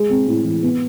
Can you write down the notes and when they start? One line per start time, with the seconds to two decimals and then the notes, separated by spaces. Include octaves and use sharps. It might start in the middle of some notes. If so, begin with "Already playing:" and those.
Already playing: G#3
0.10 C4
0.28 A2
0.45 E3
0.63 B3